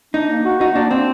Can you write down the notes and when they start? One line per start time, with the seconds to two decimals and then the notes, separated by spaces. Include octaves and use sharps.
0.14 D4 D#4
0.29 A#3
0.45 F#4
0.61 D#4 F#4
0.75 A#3 D4
0.91 C4 D4